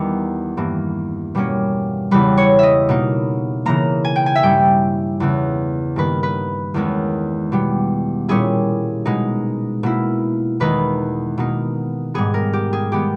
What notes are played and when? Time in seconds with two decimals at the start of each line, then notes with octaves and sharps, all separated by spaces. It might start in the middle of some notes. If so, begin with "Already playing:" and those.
Already playing: E2 D#3 G3 B3 D#4
0.57 G2 E3 A#3
1.35 B2 G3 A#3 C#4
2.11 E2 C#3 G3 B4
2.37 C#5
2.59 D#5 E5
2.89 B2 A#3 D#4
3.66 C#3 E3 A#3 A#5
4.05 G#5
4.16 G5
4.26 G#5
4.35 E5
4.43 G2 G3 C#4 E4 G5
5.20 E2 C#3 E3
5.96 G2 D#3 A#3 B4
6.23 B4
6.74 E2 D#3 G#3 C#4
7.52 B2 G3 B3
8.29 A#2 G3 C#4 E4 G#4
9.05 B2 G#3 D#4
9.83 B2 A#3 E4
10.60 E2 D#3 G#3 D#4 B4
11.38 B2 A#3 D#4
12.14 G#2 G3 B3 G#4
12.34 A#4
12.53 G4
12.73 G#4
12.92 D#3 G#3 B3 G4